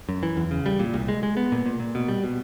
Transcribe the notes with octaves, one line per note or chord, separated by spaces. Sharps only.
F#2
E3
E2
C#3
G3
A#2
C2
G#3
G#3
B3
A#2
A#2
A#2
B2
G3
B2